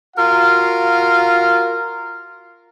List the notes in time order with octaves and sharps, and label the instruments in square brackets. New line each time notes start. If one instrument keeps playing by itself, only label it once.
[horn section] F4 F#4 A#4 F5